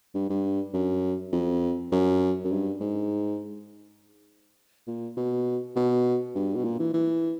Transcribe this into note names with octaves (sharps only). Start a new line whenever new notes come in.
G2
G2
F#2
F2
F#2
F#2
G2
G#2
A#2
B2
B2
G2
B2
A#2
E3
E3